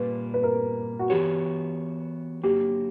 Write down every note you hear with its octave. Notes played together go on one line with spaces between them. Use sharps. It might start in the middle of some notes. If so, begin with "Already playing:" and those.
Already playing: A#2 G3 A#3 B4
B4
A#4
F#4
E3 B3 F#4 G4 C#5
D3 F#3 A#3 G4